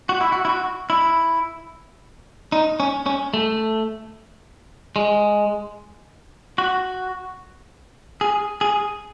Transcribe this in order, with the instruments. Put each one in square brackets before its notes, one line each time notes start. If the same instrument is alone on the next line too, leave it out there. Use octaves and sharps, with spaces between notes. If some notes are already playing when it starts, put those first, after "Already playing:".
[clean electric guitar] F#4
E4
F#4
E4
F#4
E4
D#4
C#4
C#4
A3
G#3
F#4
G#4
G#4